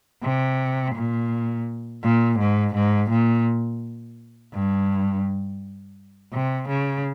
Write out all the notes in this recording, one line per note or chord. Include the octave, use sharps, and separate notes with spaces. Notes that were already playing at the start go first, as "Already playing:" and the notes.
C3
A#2
A#2
G#2
G#2
A#2
G2
C3
C#3